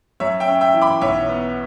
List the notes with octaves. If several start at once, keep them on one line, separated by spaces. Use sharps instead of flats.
F#2 C#5 E5
E5 G5
C#4
E5 G5
E3
B5 D6
B1 C#5 E5
B3